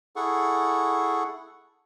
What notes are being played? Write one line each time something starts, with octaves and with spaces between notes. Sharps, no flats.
E4 G#4 A4 F#5 C#6